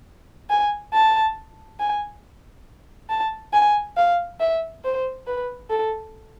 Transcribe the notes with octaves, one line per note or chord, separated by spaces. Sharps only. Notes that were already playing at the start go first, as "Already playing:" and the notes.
G#5
A5
G#5
A5
G#5
F5
E5
C5
B4
A4